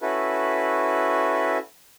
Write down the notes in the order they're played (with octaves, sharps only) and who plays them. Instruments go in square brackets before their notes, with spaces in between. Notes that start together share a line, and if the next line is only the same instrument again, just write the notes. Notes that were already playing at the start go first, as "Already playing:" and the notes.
[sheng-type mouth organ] C#4 E4 F#4 A4 B4